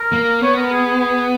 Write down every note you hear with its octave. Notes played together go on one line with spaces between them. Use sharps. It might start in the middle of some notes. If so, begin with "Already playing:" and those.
Already playing: A#4
A#3
B3 C#5
A#4
G#4
G#4
G#4